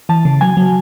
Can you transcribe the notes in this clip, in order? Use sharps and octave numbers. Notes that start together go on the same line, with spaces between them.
E3 A5
C#3
F#3 G#5
F#3